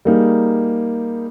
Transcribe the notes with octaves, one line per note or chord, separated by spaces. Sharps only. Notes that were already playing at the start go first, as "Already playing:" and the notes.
G3 A#3 D#4 G#4